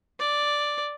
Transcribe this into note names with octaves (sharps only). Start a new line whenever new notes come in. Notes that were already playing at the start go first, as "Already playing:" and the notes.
D5